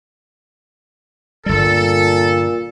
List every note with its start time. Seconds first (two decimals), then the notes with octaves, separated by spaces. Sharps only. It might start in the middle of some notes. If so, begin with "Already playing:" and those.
1.46 G1 A#2 G3 A4